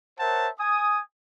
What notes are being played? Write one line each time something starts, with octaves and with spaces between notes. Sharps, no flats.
A#4 C5 C#5 E5 F#5 A5
G#5 D#6